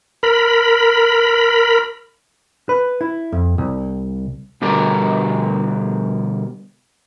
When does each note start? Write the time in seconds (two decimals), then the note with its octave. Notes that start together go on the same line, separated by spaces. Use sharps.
0.23 A#4 B5
2.69 B4
3.01 E4
3.32 F2
3.58 C2
4.62 B2 D3 G3 G4 A#4